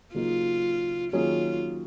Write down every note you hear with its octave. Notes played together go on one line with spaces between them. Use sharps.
C#3 F#3 A#3 D#4 F4
D#3 F#3 A#3 C#4 F4 G#4